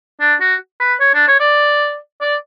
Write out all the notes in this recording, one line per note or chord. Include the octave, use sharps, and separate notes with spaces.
D4
F#4
B4
C#5
D4
C#5
D5
D5